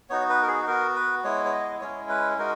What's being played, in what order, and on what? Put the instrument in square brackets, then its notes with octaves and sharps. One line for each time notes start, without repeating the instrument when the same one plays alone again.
[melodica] B3 D#4 F#4 C#5
B4
A#4
G#4
B3 F#4 A#4
B4
G#3 B3 E4 C#5
C#5
D#5
G#3 C#4 E4 C#5
B4
G#3 D#4 F#4 A#4